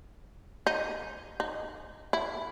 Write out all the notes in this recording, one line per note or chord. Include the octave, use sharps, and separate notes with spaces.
D#4
D#4
E4